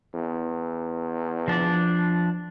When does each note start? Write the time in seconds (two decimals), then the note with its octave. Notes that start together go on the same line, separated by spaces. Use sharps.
0.14 E2
1.48 F3 D4 D5